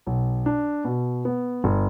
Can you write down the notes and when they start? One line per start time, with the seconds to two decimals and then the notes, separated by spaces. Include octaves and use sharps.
0.07 B1
0.46 D4
0.85 B2
1.25 B3
1.64 G1